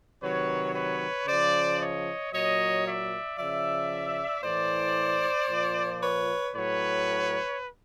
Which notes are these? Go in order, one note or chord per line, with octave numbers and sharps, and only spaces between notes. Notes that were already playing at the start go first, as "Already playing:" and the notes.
C3 D#3 F#3 B4 C#5
B4 C#5
C#3 F3 C5 D5
C#5 D#5
A#2 F#3 C#5 D#5
D5 E5
C#3 F3 D5 E5
A2 E3 C5 D5
A#2 F3
B4 C#5
A2 F#3 B4 C#5